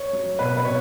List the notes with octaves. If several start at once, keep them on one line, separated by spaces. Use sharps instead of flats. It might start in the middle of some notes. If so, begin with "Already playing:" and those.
Already playing: C#5
F#3
B2 B4
B4
B2 C#5